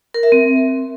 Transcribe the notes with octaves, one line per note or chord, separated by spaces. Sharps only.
A#4
E5
C4